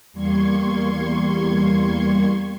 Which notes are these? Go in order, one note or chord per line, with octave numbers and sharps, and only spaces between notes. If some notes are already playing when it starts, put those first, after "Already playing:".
E2 G3 A#3 C6 C#6 G#6